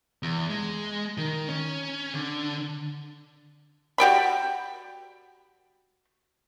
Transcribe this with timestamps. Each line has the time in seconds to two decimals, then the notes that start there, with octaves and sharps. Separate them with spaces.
0.23 E2
0.50 G#3
1.18 D#3
1.49 C#4
2.13 D3
3.98 F#4 G4 D5 B5